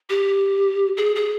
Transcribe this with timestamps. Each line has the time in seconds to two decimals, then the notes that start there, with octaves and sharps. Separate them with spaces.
0.10 G4
0.97 G#4
1.16 G#4